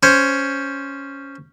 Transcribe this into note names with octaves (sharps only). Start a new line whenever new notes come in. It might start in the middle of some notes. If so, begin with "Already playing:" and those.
C#4 C5